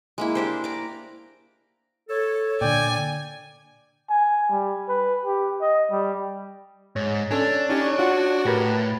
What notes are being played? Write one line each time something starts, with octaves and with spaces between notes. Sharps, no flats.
G#3 A#3 E4
D4 G4 C5
D5 A#5
A4 C#5
A#2 D3 D5 G5 G#5
G#5
G3
B4
G4
D#5
G3
G#2 C#5
C#4 D4 A4 C#5 G#5
C#4 D#4 G4 C#5
F4 F#4 F5 F#5
A2 G4 A#4 B4